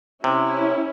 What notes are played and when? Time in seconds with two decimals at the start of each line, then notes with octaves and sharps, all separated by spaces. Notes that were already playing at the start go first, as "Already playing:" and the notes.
0.24 C3 C#4 E4